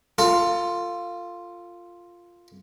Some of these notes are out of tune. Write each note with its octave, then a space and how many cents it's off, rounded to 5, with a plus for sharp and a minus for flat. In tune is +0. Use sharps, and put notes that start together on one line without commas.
F4 +0 A4 +40